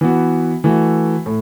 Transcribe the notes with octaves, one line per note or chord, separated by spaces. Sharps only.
E3 B3 F#4
E3 A3 F#4
A2